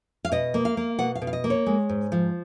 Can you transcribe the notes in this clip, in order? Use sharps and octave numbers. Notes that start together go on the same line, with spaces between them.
F5
B2 D#5
A#3
F5
A#3
B2 F#5
F5
B2
F5
D#5
A#3
C#5
G#3
G#2
F3